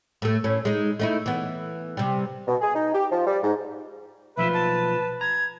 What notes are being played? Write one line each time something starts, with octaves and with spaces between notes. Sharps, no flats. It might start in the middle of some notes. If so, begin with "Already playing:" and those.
A2 A3
A2 C#4
G#3 D#4
A3 D#4 E4
E3 B3
C3 G3
B2
G#4
D#4
G4
F3
G3
G#2
B1 F3 F4 B4 E5
A5
A#5 G#6